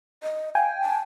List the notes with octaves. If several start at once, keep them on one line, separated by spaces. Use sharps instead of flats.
D#5
F5 G5 G#5
A5